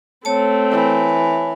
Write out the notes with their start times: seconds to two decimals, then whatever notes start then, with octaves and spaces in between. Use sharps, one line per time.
0.25 A3 C4 C#5 A5
0.71 E3